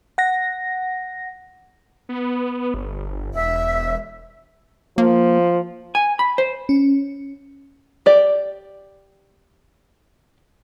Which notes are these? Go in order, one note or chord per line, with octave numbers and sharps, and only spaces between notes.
F#5 A#6
B3
G1
E1 E5
F3 A#3
G#5
B5
C5
C#4
G4 D5